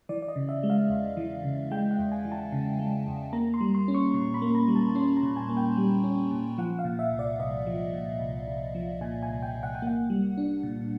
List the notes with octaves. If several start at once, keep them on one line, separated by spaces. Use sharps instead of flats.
E3 D5
D5
D#5
C#3
E5
G#3
F5
E2
E3
C#3
G#3 G5
F#5
E2
G#5
E3
A5
C#3
G#3
E2
A#3 A#5
C6
G3
C6
C#4
C#6
A#2 C6
B5
A#3
A#5
G3
A5
C#4 C6
A#5
A#2
G#5
A#3
G5
G3
C#4
A#2
F3 F#5
F5
A#2
E5
C2
D5
C2 D#5
F3
A#2
C2
C2
F3
A#2 G#5
G#5
C2
G5
C2
F#5
G5
A#3 F#5
G3
D4
A#2